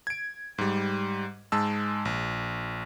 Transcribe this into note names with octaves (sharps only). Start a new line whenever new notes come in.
G#6 D7
G#2 G3
G#2 G#3 A5 E6
A#1